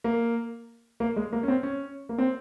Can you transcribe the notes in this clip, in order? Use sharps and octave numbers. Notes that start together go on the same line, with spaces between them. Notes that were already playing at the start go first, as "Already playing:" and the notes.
A#3
A#3
G#3
A#3
C#4
C4
C#4
A#3
C4